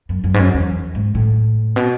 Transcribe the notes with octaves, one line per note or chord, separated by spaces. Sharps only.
F#2
F#2
G#2
F#2
E2
G#2
A2
B2